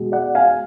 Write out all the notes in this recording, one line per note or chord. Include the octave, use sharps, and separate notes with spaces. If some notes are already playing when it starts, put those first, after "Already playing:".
Already playing: B2 G#3
D5 F#5
F5 G#5